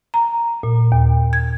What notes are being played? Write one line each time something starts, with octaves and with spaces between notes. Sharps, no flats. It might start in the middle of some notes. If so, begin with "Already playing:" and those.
A#5
A#2
D#2
G#6